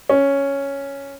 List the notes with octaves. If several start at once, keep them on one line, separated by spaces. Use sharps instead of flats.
C#4